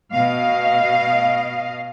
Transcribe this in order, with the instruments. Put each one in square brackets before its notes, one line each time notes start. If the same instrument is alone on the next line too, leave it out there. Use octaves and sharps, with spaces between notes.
[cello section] B2 D#5 F5